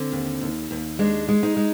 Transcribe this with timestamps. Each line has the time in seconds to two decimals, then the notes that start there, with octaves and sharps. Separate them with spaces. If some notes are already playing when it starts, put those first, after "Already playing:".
Already playing: D3 C4
0.12 D#2
0.41 D#2
0.71 D#2
0.99 G#3 D4
1.29 G#3
1.43 D#4
1.57 G#3